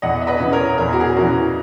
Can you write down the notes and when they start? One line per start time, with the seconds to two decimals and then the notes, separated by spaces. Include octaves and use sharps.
0.02 E2 D#5 F#5
0.22 E5
0.27 B4 D#5
0.40 C#3 E3
0.53 A#4 C#5
0.78 E2 A#4
0.86 G#4
0.93 F#4
1.00 G#4
1.16 C#3 E3 F#4 A#4